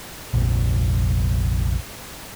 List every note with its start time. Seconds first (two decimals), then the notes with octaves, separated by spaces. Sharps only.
0.34 F1 A#1